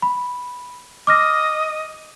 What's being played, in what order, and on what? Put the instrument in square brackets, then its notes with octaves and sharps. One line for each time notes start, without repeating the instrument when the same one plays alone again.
[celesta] B5
[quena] D#5 [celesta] D6 F6 A#6